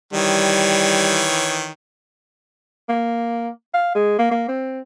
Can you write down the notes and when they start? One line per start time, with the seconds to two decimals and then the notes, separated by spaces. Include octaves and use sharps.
0.13 D#3 E3 G3 C#5
2.89 A#3
3.74 F5
3.95 G#3
4.19 A#3
4.31 A#3
4.48 C4